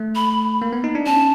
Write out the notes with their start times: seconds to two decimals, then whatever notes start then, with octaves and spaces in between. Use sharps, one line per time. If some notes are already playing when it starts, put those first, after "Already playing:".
Already playing: A3
0.15 B5
0.62 A#3
0.73 B3
0.84 D#4
0.95 D4
1.06 C#4 A5